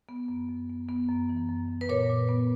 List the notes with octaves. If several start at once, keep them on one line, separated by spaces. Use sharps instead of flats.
B3
F#2
F#2
B3
B3
F#2
E3
F#2
F#2
B4
A#2 A#4 C#5
A#2
B3